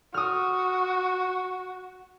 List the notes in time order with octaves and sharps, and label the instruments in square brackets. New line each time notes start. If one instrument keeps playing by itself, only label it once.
[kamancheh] F#4 [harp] D#6 F6